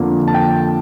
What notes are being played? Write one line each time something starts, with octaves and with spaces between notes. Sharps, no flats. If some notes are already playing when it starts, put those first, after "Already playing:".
Already playing: F2 D3 F3 A#3
A5
G5